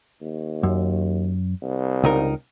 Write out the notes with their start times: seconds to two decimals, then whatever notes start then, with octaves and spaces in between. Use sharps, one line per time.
0.21 D#2
0.63 F#2
1.62 C2
2.04 C#2 D#4 A#4